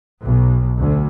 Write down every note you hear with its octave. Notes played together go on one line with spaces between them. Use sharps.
B1
D2